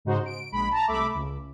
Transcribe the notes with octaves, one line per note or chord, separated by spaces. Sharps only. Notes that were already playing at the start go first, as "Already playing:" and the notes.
G#2 C#3 D#4 F#4 C5
D7
A#1 G#3 B5
A5 A#5
C2 A3 E5 B5 D6
C#2